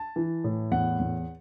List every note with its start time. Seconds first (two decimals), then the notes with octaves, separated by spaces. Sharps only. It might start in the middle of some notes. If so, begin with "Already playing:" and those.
Already playing: A5
0.16 E3
0.44 A2
0.71 E2 F#5
0.99 E2